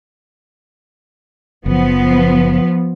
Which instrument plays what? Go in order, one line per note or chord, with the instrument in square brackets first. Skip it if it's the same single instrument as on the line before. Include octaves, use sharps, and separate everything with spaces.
[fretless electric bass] F#1 [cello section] F3 B3